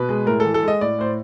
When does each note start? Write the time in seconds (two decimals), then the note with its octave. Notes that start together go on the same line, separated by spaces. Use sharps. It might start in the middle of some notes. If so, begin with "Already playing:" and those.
Already playing: B2 B4
0.09 G#3
0.26 A2 A#4
0.40 E3 A4
0.54 A4
0.63 G#3 D#5
0.81 A2 D5
0.99 A2 C5